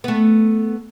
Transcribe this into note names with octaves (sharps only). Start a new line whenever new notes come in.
A3 B3